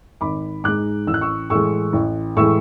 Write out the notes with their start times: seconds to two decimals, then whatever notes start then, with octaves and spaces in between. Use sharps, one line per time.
0.21 G#1 B5 D6
0.64 G#2 G#3 D6 F#6
1.07 A1 E6
1.14 F#6
1.21 C#6 E6
1.50 A2 E3 G#3 C#6 E6
1.93 A1
2.36 A2 E3 G#3 C#6 E6